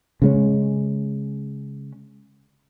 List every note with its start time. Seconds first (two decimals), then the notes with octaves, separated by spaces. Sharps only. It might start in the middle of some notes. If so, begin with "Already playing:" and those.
0.22 C#3 G#3 C#4